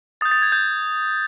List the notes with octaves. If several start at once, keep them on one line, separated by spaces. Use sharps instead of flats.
D#6 G6 A6
A6
G#6
G6